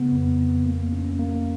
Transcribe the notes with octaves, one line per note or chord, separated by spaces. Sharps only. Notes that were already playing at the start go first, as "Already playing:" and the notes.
Already playing: C#3 B3
F2
F2
A#3
C#4
A#3